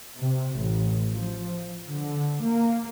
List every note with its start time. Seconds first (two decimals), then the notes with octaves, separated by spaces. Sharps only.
0.18 C3
0.57 A1
1.12 F3
1.89 D3
2.42 A#3